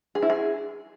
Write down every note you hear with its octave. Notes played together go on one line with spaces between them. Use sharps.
G#4
E4
G#4